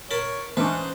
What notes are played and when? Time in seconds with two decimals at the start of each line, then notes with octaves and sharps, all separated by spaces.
0.11 A#4 C#5 A5 B5
0.57 G#2 E3 C#4 D4 B4 C5